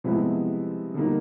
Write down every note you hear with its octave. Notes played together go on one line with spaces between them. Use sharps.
C3 F3 G#3 B3 E4
D3 G3 A#3 D#4